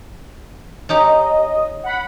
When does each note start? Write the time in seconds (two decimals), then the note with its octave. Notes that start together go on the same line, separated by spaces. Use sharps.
0.89 C#4 D#4 G4 D#5
1.83 F#5 B5